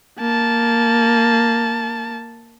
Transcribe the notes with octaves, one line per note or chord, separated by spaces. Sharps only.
A#3 A5